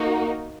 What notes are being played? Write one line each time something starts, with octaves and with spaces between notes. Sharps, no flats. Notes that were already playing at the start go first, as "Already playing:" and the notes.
Already playing: A#3 D#4 F#4